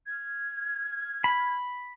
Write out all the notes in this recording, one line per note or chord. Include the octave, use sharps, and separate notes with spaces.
F6 G#6
B5